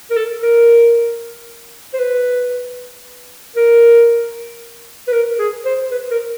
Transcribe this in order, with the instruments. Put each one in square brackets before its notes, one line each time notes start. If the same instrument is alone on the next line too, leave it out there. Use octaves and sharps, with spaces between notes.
[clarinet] A#4
A4
A#4
C5
B4
A#4
B4
A#4
G#4
C5
B4
A#4